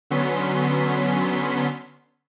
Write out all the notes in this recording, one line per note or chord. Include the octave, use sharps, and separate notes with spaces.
D3 F#3 B3 C#4 C6 B6